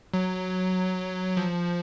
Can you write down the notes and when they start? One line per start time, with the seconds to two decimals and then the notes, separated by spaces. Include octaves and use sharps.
0.14 F#3
1.37 F3